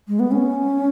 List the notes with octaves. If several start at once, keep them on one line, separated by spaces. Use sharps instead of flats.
G#3
B3
C#4